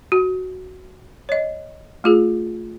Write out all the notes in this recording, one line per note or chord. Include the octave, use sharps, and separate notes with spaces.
F#4
C#5 D#5
A3 F4 G#4